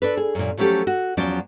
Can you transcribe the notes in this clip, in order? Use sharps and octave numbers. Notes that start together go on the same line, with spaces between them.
D4 A4 B4
G#4
F#2 A#2
F3 F#3 A3 C#4 G4 A4
F#4
E2 F3 F#3 C#4 D5